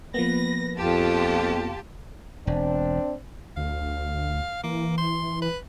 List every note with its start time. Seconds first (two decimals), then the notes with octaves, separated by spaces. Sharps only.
0.14 F3 A#3 B3 B4 A#6
0.77 F2 F4 G4 A5
2.47 E1 C4 D4
3.57 D2 F5
4.64 E3 A#3
4.98 C6
5.42 B4